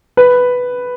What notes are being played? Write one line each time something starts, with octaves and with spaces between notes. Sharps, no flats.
B4